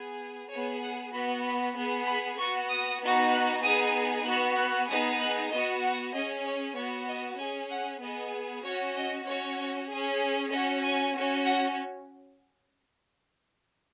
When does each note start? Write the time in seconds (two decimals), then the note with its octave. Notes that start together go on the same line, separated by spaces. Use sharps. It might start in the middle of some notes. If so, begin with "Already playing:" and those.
Already playing: B3 G#4
0.50 B3 G#4 C#5
0.81 F#5
1.13 B3 F#4 B5
1.45 B5
1.75 B3 G#4
2.07 B5
2.38 B3 F#4 C#6
2.69 D#6
3.01 B3 D#4 F#4
3.32 F#6
3.63 B3 D#4 G#4 D#6
4.25 B3 F#4 F#6
4.57 F#6
4.89 B3 D#4 G#4
5.19 F#6
5.52 B3 F#4 D#5
5.83 F#5
6.13 C#4 G#4 D#5
6.45 C#5
6.76 B3 F#4 C#5
7.08 D#5
7.39 C#4 G#4 G#5
7.70 F#5
8.01 B3 G#4 D#5
8.64 C#4 F#4 C#5
8.96 D#5
9.26 C#4 F#4 C#5
9.89 C#4 G#4
10.52 C#4 F#4 D#5
10.83 G#5
11.14 C#4 F#4
11.45 F#5